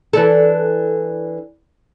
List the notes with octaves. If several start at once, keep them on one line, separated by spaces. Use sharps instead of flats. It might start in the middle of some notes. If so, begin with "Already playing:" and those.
E3 D4 A4